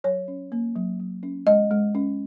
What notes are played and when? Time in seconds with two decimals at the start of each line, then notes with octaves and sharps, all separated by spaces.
0.04 F#3 C#5
0.28 C#4
0.52 A#3
0.76 F#3
1.00 F#3
1.23 C#4
1.47 G#3 D#5
1.71 G#3
1.95 C#4